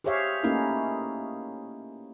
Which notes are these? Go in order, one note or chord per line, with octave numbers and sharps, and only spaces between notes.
G4 G#4 C5 C#5 E5 F5
A3 A#3 C#4 D#4 E4 G4